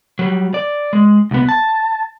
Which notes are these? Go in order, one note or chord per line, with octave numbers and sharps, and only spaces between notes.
F#3 G3
D5
G#3
C2 B3
A5